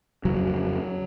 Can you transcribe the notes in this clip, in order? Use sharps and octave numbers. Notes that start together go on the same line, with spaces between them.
F2 C#3 F#3